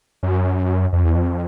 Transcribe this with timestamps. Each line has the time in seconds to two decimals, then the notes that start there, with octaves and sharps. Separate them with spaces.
0.23 F#2
0.93 F2
1.04 E2
1.16 F2